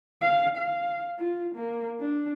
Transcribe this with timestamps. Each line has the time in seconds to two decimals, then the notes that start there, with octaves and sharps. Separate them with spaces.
0.22 F5
0.57 F5
1.19 F4
1.55 A#3
2.00 D4